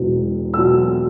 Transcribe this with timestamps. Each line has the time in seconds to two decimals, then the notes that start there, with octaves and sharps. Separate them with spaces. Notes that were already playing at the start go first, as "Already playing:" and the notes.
Already playing: E1 E2 B2 F#3
0.54 B2 F#3 E6